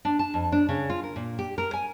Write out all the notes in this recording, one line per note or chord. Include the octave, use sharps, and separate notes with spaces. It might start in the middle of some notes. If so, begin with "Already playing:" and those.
D4
A5
F2
D4
C#3
F4
A#4
A#2
G4
A#4
G#5